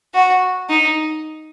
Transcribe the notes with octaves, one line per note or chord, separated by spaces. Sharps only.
F#4
D#4